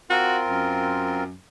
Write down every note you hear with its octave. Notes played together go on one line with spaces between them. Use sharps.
C4 F4 F#4 A#4
F#2